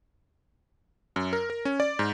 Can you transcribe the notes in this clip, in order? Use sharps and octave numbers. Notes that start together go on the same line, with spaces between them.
F#2
A#4
A#4
C#4
D5
G#2